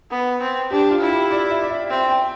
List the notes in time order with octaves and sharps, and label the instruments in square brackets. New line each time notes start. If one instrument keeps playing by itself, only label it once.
[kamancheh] B3
C4
[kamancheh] D4 [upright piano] G4
[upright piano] F4
[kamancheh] E4
[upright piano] G4
D5
E5
D5
E5
[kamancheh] C4 [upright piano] E5
[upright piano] G5